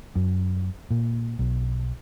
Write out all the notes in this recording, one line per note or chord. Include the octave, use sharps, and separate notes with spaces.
F#2
A#2
B1